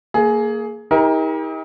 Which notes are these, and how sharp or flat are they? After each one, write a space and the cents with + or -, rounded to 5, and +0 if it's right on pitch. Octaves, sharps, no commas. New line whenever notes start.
A#3 -15 G#4 +15
D#4 +40 G4 +40 A#4 +15